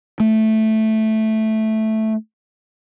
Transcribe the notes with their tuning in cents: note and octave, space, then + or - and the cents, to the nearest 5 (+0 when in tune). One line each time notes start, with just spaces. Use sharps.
A3 -5